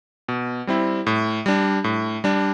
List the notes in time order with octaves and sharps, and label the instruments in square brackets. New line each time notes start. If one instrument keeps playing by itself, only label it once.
[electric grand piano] B2
G3 C4 E4
A2
G3 D4
A2
G3 D4